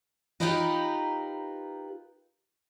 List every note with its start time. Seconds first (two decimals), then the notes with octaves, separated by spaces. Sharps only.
0.40 D#4 F4 G4 A#4 B4 D#5